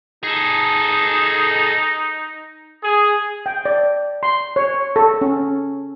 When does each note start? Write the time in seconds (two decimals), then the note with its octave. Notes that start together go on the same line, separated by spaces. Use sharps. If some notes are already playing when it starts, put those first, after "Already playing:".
0.23 D#4 G#4 A4
2.82 G#4
3.46 G5
3.65 D5
4.23 C6
4.56 C#5
4.96 A4
5.21 C#4